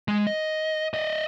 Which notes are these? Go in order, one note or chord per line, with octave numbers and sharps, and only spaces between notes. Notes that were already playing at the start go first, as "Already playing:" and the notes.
G#3
D#5
D5 D#5